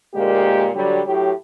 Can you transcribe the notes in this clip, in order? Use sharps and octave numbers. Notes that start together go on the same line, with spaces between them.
D2 A#2 G#3 A#3 G4
D3 F#3 G3
A2 F#3 G4